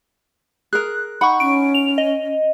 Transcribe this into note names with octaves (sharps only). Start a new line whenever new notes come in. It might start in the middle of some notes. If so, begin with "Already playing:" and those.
G#4 A#4 F#6
D#4 F#5 B5 C#6
C#4 D7
F7
D#5